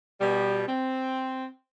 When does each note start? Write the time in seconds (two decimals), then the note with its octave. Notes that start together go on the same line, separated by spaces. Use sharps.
0.21 B2 G3
0.67 C4